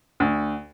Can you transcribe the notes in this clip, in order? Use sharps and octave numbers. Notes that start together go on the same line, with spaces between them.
D2